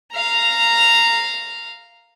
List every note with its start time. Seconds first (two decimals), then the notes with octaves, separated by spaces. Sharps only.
0.14 F5 A#5